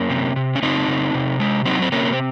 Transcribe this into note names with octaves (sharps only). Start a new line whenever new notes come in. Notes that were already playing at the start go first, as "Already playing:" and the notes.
Already playing: F#2 A#3 C#4
C3
C3
C#4
C#3 C4 D#4
C#3
C3
G#3
F#3 C4 D#4
C4
C3 A#3 C#4
C4